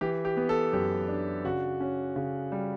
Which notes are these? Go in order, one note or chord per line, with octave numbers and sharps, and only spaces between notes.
E3 G4
G4
B3
A4
F#2 G4
D4
C#3 F#4
C#4
C#3
G3